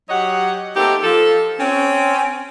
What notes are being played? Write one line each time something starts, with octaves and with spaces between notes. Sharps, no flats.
F#3 G4 C#5 D#5 F#5
A3 A#3 C4 D#4 G4
F3 A4
C4 C#4